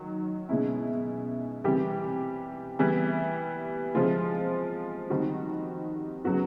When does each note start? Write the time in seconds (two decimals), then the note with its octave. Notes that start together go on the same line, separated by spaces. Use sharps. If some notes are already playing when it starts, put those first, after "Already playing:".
Already playing: D#3 F#3
0.49 B2 G#3 C#4 E4
1.64 C3 E3 G3 G4
2.79 E3 G3 B3 E4
3.94 C3 F3 G#3 F4
5.10 D#3 G3 C4 F#4
6.24 C#3 F#3 B3 F#4